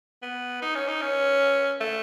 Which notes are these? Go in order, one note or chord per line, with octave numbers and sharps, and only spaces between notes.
B3
D#4
C#4
D#4
C#4
A3